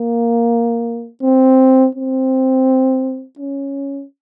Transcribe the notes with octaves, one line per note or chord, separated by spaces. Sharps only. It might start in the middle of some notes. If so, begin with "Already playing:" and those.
Already playing: A#3
C4
C4
C#4